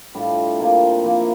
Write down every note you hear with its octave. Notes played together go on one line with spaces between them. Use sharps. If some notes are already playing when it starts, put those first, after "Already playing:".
A2 G3 D4 F4
C3 G3 A#3 F4
F3 A#3 E4